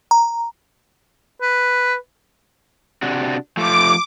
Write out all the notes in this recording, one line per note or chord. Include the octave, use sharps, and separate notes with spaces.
A#5
B4
C3 D4 F#4
F3 A3 D6